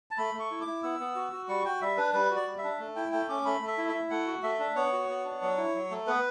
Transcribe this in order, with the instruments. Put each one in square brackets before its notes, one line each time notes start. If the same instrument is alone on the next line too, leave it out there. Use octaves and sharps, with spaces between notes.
[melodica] A5
A3 B5
A3
C#6
E4
D6
E4
B3 E6
B3
F#4
F#4
G3 C#6
F#4 G5
G3 E5
D4 B4
G3 B4
F#4
D5
G3
E5
D4
A3
E4 G5
A3 G5
C#4 D6
A3 B5
A3
E5
E4
E5
E4
A3 F#5
F#4
A3 E5
D4
B3 C#5
F#4
B3
D4
F#3
E4
F#3
A3
B3 B4